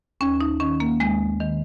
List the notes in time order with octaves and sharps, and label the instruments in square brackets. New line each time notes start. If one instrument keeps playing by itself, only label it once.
[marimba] D#2 C#4
D#4
D#3 C#4
A#3
D#2 G#3
D#3